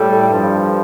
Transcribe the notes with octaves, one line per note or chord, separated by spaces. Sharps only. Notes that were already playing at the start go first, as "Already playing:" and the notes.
Already playing: A2 G3 A4
G2 F3